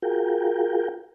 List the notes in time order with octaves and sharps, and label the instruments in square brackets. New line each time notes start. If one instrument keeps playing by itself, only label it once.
[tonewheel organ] F4 F#4 G#4 A#4 G5